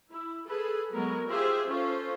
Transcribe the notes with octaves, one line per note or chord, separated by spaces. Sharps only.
E4
G#4 A4 B4
F#3 G#3 B3 A#4
F4 G4 G#4 C5 E5
C#4 F4 A4 C5